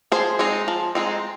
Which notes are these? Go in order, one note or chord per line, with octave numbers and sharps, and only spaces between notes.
F3 G#4 C5
G#3 C4 D#4
F3
G#3 C4 D#4